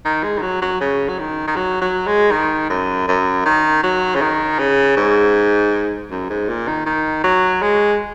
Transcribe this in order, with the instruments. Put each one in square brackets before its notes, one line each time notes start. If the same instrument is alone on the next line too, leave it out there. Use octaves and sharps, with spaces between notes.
[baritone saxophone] D#3
G#3
D#3
F#3
F#3
C#3
F#3
D#3
D#3
F#3
F#3
G#3
D#3
F#2
F#2
D#3
F#3
C#3
D#3
C#3
G#2
F#2
G#2
A#2
D#3
D#3
F#3
G#3